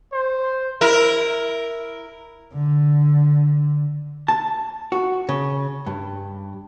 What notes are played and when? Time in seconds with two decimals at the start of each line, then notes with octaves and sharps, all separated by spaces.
0.13 C5
0.81 E4 A#4
2.53 D3
4.28 A5
4.92 F#4
5.29 C#3
5.86 G2